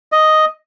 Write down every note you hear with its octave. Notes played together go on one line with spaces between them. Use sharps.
D#5